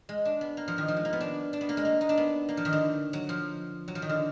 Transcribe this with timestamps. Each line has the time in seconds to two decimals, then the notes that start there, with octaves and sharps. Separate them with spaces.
0.09 G#3
0.25 D4
0.41 B3
0.57 A#3
0.68 F3
0.78 D#3
0.88 F3
0.97 G#3
1.05 A#3
1.13 B3
1.21 D4
1.53 D4
1.61 B3
1.69 A#3
1.77 G#3
1.85 A#3
2.01 D#4
2.09 D4
2.18 B3
2.49 A#3
2.57 F3
2.65 D#3
2.73 D3
3.13 F#3
3.29 F3
3.88 F#3
3.95 F3
4.02 D#3
4.09 D3